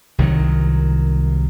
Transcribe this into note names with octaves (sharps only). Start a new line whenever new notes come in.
C2 D#3 F#3